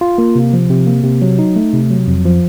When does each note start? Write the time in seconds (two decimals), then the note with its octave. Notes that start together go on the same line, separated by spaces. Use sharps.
0.01 F4
0.18 A#3
0.35 C3
0.53 F3
0.70 C3
0.87 A#3
1.04 C3
1.22 F#3
1.39 D#4
1.56 A3
1.73 C3
1.90 F#3
2.07 F2
2.25 F3